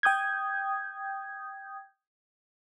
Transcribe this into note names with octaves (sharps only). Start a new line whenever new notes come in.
G5 D#6 G6 G#6